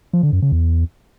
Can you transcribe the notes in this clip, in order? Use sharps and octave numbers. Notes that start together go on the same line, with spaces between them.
F3
D3
F#2
C#3
E2